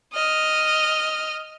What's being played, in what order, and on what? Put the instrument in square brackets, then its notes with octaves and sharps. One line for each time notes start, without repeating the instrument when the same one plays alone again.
[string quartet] D#5 F6